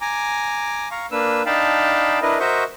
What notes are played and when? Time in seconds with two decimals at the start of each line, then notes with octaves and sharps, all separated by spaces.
0.01 G#5 A#5 D6
0.91 F5 A#5 C#6
1.12 A#3 D4 B4 E6
1.46 D4 D#4 F5 G5 A5 B5
2.22 D4 E4 A#4 B4 D#5
2.40 F#4 A#4 C5 D#5 E5 C#6